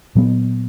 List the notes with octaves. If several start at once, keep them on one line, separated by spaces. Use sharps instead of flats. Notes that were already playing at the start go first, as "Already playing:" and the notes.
A#2 F#3 B3